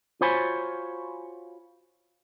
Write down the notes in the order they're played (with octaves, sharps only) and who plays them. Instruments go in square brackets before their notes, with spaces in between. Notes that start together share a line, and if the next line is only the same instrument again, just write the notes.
[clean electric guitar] F4 F#4 C5 C#5 G#5 B5